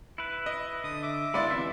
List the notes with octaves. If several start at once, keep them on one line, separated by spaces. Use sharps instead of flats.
E4 B4
D#5
D3 D#6
E5 D6
G#3 B3 E4 D5 F5 B5 C6 A6
C3 E3 E5